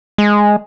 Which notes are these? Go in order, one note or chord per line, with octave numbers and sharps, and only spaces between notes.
G#3